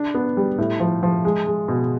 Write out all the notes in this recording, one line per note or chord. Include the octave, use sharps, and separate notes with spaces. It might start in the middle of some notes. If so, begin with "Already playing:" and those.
Already playing: D4
B3
G3
A2
F3
F3
G#3
G#3
B2